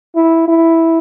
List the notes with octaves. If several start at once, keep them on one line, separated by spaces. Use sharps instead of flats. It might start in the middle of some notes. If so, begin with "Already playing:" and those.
E4
E4